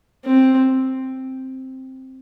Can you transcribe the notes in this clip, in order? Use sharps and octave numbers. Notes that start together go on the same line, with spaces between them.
C4